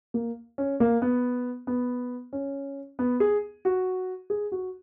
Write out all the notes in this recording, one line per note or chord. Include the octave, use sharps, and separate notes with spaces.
A#3
C#4
A#3
B3
B3
C#4
B3
G#4
F#4
G#4
F#4